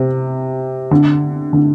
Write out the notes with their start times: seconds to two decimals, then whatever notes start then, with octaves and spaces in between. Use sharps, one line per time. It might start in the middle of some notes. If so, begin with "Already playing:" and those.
Already playing: C3
0.91 D3
1.53 D3